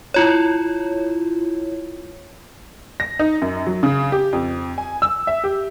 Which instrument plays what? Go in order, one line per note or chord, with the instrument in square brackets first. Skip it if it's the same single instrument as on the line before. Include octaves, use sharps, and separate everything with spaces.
[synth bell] E4 F4 C#5
[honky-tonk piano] A#6
D#4
F#2
F#3
C#3
G4
F2
G#5
E6
E5
G4